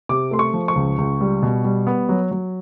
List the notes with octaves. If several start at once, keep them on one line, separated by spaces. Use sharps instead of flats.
C3 D6
A3 C6
C#6
F3
C#6
C#2
C#2
G3
B2
G3
B3
F#3
F#3